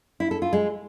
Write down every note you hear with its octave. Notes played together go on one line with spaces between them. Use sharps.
E4
A4
F4
G#3